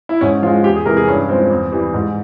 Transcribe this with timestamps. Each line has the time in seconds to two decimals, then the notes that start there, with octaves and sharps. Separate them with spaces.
0.09 E4
0.21 G#2 C#4
0.43 F3 F4
0.46 G#3
0.64 E2 G4
0.76 G#4
0.86 C3 E3 G#3 A#4
0.97 G#4
1.08 G2 C#4
1.29 F3 G#3 C4
1.51 E2
1.72 E3 G3
1.94 G#2